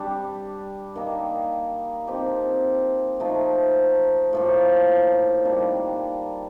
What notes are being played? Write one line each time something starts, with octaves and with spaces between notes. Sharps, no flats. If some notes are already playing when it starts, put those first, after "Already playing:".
Already playing: G3 D4 G4
D#3 A#3 D#4
F3 C4 D#4 G4
F3 A3 D#4
A2 F3 A#3
D#3 G3 A#3 D4